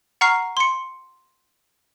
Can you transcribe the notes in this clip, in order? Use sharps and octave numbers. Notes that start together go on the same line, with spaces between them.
F#5 A#5 C#6 F6 C7
C6 C#7